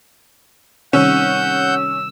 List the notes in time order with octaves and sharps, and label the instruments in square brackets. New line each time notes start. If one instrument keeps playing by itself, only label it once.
[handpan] C3 D#3 G3 [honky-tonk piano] C#4 [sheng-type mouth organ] F#5 G6 [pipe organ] E6